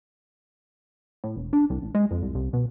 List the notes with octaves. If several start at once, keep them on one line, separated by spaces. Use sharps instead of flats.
A2
E1
D4
C2
A1
G#3
F2
C2
C2
B2